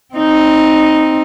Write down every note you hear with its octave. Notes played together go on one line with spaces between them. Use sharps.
C4 D#4